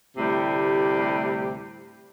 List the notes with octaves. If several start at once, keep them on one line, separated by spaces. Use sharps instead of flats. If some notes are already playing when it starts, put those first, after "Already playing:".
D2 A2 C3 G3 G4